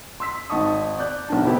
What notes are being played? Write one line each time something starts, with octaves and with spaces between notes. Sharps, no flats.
C6 E6 B6
G#1 D#4 A5 C#6 D#6
D5 F#6 G6
B1 C#4 D4 A5
F#1 C#3 B3 C4 E4 G4